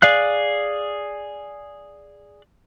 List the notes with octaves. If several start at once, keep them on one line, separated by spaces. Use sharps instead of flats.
G#4 D5 F5 F#6